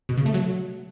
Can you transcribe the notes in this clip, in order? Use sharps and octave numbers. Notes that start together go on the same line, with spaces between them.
B2
C#3
A3
F#3